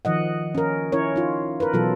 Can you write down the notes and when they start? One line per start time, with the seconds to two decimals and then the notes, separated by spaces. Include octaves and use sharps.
0.05 D#3 F3 D#5 F#5
0.55 C#4 A#4
0.92 C#4 E4 A#4 C#5
1.16 D#4 F4
1.60 A#4 B4
1.73 B2 E3 F#3 F4 A4